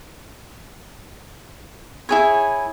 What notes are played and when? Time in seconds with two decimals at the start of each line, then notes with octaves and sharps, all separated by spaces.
2.09 E4 G#4 C#5